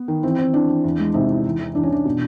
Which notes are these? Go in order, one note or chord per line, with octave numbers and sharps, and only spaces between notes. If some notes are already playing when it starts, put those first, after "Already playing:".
Already playing: B3
D#3
E3 C4
E3 C4
E3 D4
E3
E2
G#3
C3 D#4
E2
E2
E3
E2 D4
C#4
E3 D4
B2